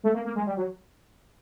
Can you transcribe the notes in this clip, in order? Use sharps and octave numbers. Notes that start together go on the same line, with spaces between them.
A3
A#3
A#3
G#3
G3
F#3